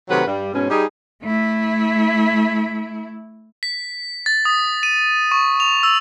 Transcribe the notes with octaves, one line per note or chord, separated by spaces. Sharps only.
C3 D#3 F#3 A3 B4 F#5
G2 G3
G#2 B2 C#4
G3 D#4 G4 G#4
A3 E4
B6
A6
D#6
D#7
C#6
F7
E6